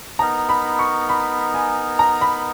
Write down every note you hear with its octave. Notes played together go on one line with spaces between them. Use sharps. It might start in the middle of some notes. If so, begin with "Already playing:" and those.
B3 D#4 A#4 A#5
B5
C#6
B5
G#5
A#5
B5